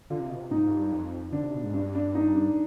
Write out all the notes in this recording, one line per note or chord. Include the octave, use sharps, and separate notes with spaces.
D3 F4
C3
B2
C3
G#2 D#4
G#2
G2
F2
D3 D4
C3
B2
G#2
G2 D4
D4
D#4
D4